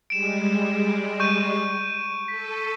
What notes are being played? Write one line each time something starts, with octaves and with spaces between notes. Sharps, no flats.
G3 G#3 D7 E7
C#6 G6 D#7
A4 B6